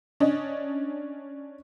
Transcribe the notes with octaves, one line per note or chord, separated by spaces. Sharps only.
C#4 D4 D#5